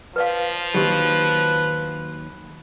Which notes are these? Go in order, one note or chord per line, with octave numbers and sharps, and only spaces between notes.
F3 B4 D5 F5
D#2 D#3 F#3 G4 B4